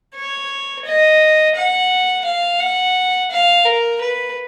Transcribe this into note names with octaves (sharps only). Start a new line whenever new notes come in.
C#5
D#5
F#5
F5
F#5
F5
A#4
B4